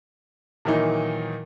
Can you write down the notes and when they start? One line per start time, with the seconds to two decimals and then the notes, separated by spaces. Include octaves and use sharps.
0.65 A#2 D#3 E3 F#3 D#4